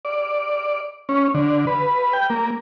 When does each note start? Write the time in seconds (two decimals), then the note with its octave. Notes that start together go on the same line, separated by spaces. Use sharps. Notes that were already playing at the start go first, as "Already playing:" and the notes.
0.05 D5
1.09 C#4
1.34 D3
1.67 B4
2.13 G5
2.30 A#3